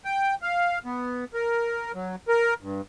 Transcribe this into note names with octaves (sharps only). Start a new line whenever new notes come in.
G5
F5
B3
A#4
F#3
A#4
G2